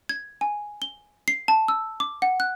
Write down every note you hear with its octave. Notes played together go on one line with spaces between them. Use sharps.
G#6
G#5
G7
C7
A5
E6
D6
F#5
F#6